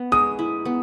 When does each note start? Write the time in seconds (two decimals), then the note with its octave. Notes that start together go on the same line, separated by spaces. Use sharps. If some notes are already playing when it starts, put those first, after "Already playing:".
Already playing: B3
0.12 G#3 D#6
0.39 E4
0.65 B3